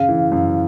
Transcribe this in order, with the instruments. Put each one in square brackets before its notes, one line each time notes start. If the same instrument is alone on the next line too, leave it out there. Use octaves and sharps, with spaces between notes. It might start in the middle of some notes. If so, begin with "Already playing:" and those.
Already playing: [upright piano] C#3 [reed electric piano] F5
[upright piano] E3
F#2